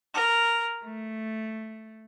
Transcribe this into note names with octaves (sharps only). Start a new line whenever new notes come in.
A#4
A3